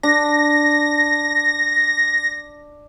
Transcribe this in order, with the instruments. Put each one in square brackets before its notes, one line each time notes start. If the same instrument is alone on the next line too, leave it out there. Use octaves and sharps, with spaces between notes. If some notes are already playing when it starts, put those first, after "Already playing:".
[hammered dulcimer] D4 [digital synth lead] A#6